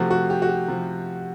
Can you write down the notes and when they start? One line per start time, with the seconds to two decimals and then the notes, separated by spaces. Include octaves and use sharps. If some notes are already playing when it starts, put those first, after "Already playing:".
Already playing: C3 F3 A3 F#4
0.11 F#4
0.30 G4
0.42 F#4
0.49 G4
0.68 C3 F3